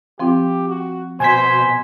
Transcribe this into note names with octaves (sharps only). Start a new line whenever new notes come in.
F3 C4 F4 G4
F#4
B2 C5 G#5 G#6 B6